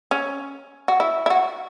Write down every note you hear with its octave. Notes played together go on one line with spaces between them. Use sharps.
C#4
F#4
E4
E4
F#4